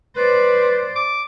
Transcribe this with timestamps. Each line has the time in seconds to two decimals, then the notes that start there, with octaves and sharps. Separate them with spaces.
0.16 B4 C5 D5
0.96 D6